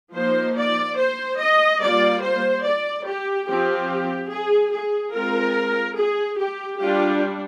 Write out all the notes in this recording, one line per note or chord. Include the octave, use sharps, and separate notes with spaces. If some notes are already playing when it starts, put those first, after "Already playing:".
F3 A#3 D#4 C5
D5
C5
D#5
G3 A#3 F4 D5
C5
D5
G4
F3 C4 F4 G4
G#4
G#4
G#3 C4 F4 A#4
G#4
G4
G3 D4 F4 G4